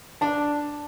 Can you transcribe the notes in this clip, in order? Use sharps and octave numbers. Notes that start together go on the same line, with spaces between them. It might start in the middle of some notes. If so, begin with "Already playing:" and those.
D4 A5